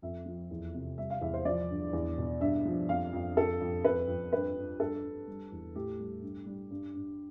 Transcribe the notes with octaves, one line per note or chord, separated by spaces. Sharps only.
F2 E5
F3
E2
C3
G3 E5
F5
E2 E5
C5
F3 D5
G2
E2
B2
G2 E5
F3
F2 F5
F2
F2 A4
F2
F2 B4
F2
G2 B4
G2
G2 A4
G2
G3
E2
A2 G4
G3
G2
G3
G2
G2